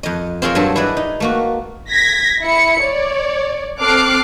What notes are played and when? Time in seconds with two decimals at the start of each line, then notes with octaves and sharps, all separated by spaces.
0.03 F2 D#5
0.42 C4 F4 G#4 A#4 C#5
0.55 G2 F#3 C4 A4
0.76 E4 G#4 B4 D5 D#5
0.97 D#4
1.20 A3 A#3 F#4
1.90 G#6 A#6 B6
2.42 E4 B5 C#7
2.83 C#5 D5
3.80 C4 A4 D6 F6 F#6 C7